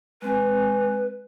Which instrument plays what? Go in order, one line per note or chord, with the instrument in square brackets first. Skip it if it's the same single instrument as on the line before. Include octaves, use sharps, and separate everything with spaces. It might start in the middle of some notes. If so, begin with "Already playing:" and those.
[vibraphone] G#3 C4 G#5 [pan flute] B4